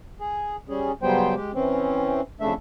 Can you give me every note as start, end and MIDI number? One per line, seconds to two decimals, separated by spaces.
0.20 0.56 68
0.69 0.92 55
0.69 0.92 61
0.69 0.92 68
1.02 1.34 49
1.02 1.34 54
1.02 1.34 55
1.02 1.34 59
1.02 1.34 72
1.02 1.34 79
1.35 1.52 56
1.35 1.52 67
1.54 2.21 52
1.54 2.21 60
1.54 2.21 61
2.41 2.54 41
2.41 2.54 49
2.41 2.54 57
2.41 2.54 62
2.41 2.54 76